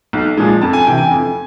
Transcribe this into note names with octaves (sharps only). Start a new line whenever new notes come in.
B1
A#2 F3 G#3
F2 A5
G#5
C3 E3 G5
G#5
F2